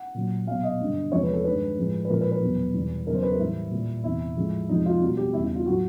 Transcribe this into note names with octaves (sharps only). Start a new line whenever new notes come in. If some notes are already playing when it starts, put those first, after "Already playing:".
Already playing: F#5
A#2 F#3
B2 F#3 F5
D#5
G2 D3 G3
E2 C3 F3 G#3 C#5
B4
A4
G2 D#3 G#3 B4
A2 F3 G#3
B4
A#2 F3 G#3 A#4
B4
B4
E2 B2 F#3
E2 B2 G3
E2 C#3 F#3 A#4
C5
B4
A#4
A2 E3 G3 E4
A#2 G3
E2 C3 E3 E4
A2 F3 G#3
F2 C3 F3 G#3 D#4
F4
B2 G3 F#4
G4
E2 C#3 E3 G3 E4
E4
F4
A2 F#3 F#4